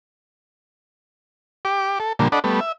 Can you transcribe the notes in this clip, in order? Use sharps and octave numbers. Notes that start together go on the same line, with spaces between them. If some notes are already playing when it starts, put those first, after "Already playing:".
G4 D6
A4
A#2 D3 F3 G3 A#3
D4 A4 D5 D#5 F#5 B5
G3 A3 B3
E5